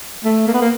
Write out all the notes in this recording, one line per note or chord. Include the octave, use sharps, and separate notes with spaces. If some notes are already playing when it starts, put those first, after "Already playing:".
A3
A#3
B3
A#3